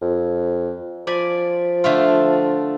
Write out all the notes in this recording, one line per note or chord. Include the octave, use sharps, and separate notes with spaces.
F2
F3 D5 G#5 B5
D3 A3 F4